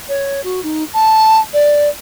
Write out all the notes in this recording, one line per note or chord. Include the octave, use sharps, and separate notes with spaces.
C#5
F#4
D#4
A5
D5